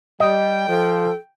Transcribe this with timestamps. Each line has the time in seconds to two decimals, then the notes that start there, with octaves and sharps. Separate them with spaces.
0.20 G3 D#5 G5
0.67 F3 A4